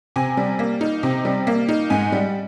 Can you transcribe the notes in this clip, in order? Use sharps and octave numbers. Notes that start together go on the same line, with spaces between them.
C3 G#5
G3
A#3
D#4
C3
G3
A#3
D#4
G#2 G#5
G3